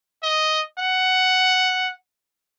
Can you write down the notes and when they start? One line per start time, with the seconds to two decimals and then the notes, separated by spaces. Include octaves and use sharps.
0.23 D#5
0.78 F#5